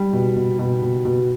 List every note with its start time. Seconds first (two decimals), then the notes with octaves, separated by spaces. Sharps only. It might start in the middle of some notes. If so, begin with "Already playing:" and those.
Already playing: G3
0.13 B2
0.36 B2
0.59 B2
0.82 B2
1.05 B2